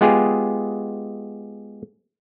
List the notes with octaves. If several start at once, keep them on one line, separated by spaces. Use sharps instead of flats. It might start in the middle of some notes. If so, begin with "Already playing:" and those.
G#3 B3 F4 G4 G#4